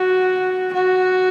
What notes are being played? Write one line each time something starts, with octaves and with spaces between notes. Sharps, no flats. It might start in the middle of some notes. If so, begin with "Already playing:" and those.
Already playing: F#4
F#4